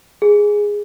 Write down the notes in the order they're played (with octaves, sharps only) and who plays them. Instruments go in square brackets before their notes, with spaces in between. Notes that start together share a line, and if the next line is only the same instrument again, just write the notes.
[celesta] G#4